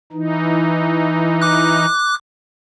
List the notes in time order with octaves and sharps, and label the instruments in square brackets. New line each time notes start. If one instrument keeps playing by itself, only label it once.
[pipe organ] E3 D#4
[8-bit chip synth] D6 F#6